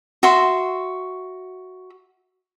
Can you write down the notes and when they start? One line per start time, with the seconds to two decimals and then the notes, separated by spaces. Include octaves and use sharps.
0.23 F#4 E5 C6